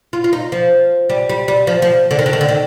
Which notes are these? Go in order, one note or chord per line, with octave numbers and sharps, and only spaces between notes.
F4
F4
D#4
F3
G3
G3
G3
F3
F3
D3
D#3
D3
D#3
D3
D#3